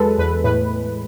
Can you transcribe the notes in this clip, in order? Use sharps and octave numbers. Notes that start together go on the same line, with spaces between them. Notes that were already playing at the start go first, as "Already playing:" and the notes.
Already playing: E2 F#3 G#3 A4 B4
E2 B4
A2 B4